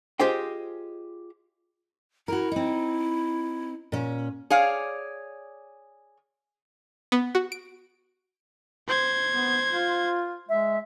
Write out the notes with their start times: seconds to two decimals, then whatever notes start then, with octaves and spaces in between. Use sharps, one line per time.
0.19 F4 G4 G#4 C5 D#5 G5
2.28 E4 F#4 A#4
2.52 C4 D#4
3.92 A#2 C#4
4.50 G#4 C#5 D5 F5
7.12 B3
7.35 F#4
7.52 D7
8.88 C5 G#6
9.31 B3
9.71 F4
10.49 G#3 E5